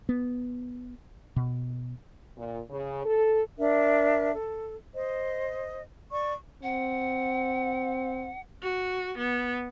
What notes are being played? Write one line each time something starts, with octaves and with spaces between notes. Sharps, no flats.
B3
B2
A#2
C#3
A4
D4 A#4 E5
A4
C5 D#5
D5 C#6
C4 F#5
F#4
B3